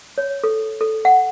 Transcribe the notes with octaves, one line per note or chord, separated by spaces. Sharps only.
C#5
A4
A4
F#5